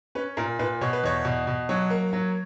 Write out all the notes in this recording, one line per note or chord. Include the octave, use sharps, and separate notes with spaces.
C#4 B4
A#2 A#4
A#2 B4
B2 C#5
B4
E2 C#5
B2
B2
F#3 C#5
A#3
F#3